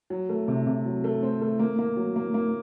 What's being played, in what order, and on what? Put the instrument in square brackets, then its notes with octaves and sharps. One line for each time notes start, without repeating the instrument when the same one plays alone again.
[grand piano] F#3
A3
C3
C3
F#3
A3
C4
A3
A#3
A#3
F#3
A#3
A#3